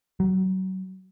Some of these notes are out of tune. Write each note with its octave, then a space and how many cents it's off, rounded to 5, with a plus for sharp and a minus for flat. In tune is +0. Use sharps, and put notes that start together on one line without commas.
F#3 +30